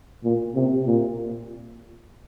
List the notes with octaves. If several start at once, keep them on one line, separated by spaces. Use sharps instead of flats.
A#2
C3
A#2